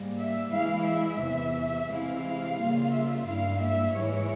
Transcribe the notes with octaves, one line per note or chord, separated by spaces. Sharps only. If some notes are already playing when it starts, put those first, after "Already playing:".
Already playing: G#2 G3 A#3
E5
E3 G#3 E4 F5
E5
E2 C3 E3
C3 E3 G#3 E4 F5
C#3 G3 A#3 F4
E5
G2 G3 A#3 E4 F5
E5
G#2 E3 G#3 E4 C#5